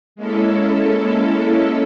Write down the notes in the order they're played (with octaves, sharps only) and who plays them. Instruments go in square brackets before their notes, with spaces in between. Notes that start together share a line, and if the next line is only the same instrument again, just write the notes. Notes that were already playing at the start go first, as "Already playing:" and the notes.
[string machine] G#3 A#3 C#4 E4 A4